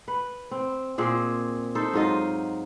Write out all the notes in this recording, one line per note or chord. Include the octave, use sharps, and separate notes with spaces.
B4
C4
A#2 C4 G#4
D#4 A4 C5
G#2 F#3 F4 D#5